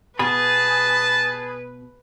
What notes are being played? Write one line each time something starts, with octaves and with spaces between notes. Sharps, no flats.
B2 G#4 B4 A5 B5